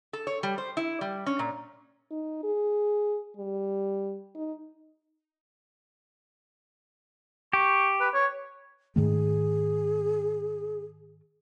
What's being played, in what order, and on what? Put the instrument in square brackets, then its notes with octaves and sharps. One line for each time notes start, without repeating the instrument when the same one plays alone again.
[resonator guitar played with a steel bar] A4
C#5
G3
C5
E4
G3
C#4
A#2
[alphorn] D#4
G#4
G3
D#4
[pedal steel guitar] G4 [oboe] C#6
[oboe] B4
C#5
[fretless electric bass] G#2 D#3 A3 [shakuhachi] G#4